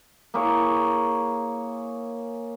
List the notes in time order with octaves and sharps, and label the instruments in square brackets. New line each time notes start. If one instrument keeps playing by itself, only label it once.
[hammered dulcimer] A#3 E4 G#4 C#5